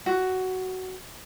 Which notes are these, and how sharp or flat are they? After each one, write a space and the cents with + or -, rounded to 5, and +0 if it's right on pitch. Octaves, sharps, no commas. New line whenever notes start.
F#4 +10